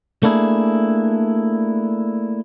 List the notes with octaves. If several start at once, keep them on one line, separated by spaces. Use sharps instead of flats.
A3 A#3 D4 E4 F#4 G#4